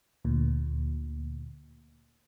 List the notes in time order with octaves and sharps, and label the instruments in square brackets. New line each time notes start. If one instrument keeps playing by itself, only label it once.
[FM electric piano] D2 A#2